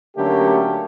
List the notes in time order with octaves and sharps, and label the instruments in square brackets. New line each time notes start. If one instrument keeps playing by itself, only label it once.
[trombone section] D3 F#3 A3 A#3 C#4 G4